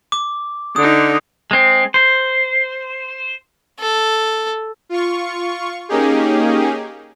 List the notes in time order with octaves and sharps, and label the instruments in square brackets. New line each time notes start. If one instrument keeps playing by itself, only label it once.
[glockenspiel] D6
[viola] D3 D#4 [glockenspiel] D#6
[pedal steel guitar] G#3 C4
C5
[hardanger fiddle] A4
[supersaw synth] F4 C#6
A#3 C#4 D#4 G4 G#4